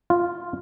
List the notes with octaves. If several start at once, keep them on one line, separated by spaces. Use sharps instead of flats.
F4